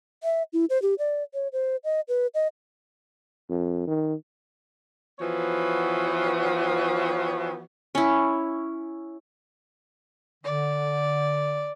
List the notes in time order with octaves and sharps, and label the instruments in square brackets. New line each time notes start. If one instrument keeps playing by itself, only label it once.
[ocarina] E5
E4
C5
G4
D5
C#5
C5
D#5
B4
D#5
[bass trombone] F2
D#3
[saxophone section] E3 F3 B3 F#4 C#5
[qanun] C#4 E4
[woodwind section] D3 [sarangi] D5